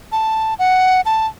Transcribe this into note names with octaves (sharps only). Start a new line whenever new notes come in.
A5
F#5
A5